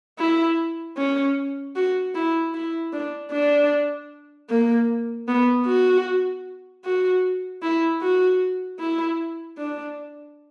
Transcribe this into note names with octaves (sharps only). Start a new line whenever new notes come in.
E4
C#4
F#4
E4
E4
D4
D4
A#3
B3
F#4
F#4
E4
F#4
E4
D4